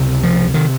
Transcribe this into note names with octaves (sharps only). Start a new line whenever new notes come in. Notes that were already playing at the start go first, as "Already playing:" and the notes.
Already playing: C#2 C3
F3
C3 D#3